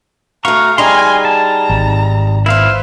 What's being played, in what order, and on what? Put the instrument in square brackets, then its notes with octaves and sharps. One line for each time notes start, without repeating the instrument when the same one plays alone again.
[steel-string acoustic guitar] A3 F#4 [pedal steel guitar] F5 C#6 [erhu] A#5
[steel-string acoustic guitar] G3 D#4 G#4 [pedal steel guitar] F5 A#5 C6 [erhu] G#5
[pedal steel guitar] A5 [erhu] A#5
[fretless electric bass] G#1
[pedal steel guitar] E4 F5 [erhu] B4 [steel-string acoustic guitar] C5 E5